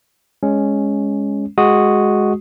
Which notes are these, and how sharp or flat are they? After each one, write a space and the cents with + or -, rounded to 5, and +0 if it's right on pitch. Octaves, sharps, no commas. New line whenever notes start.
G#3 -5 C#4 +5
G#3 +0 F#4 +0 D#6 +0